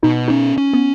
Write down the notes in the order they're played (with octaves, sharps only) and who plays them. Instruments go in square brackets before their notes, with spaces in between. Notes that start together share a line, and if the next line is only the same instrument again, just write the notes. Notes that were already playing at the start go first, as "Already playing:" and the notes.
[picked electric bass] B2 [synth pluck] D#4
[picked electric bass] C#4 [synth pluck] D#4
[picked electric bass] C#4
[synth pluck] B3